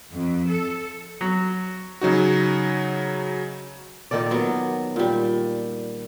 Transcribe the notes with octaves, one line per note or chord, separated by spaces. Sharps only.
F2
A4
F#3
C#3 F#3 D#4 F#4
A#2 D#3 A4 D5
F#3 B3
A#2 G3